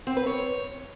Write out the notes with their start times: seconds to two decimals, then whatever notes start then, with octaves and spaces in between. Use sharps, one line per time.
0.07 C4
0.17 B4
0.27 C#5